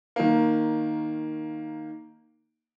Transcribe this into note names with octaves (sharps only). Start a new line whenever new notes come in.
D#3 A#3